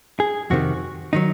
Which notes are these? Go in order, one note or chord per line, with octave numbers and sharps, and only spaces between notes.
G#4
F2 C3 D#3 F#4
D#3 F#3 D#4